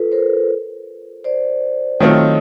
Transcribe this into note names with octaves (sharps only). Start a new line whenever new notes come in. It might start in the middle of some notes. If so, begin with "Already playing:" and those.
Already playing: F4 A4 B4
A#4 C5
C5 D5
D#3 F#3 A3 C4 F4 C#5 D#5